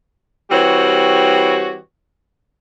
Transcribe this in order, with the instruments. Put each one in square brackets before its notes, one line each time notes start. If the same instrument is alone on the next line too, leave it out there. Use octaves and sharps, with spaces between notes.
[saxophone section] E3 G3 C4 F#4 G4 C#5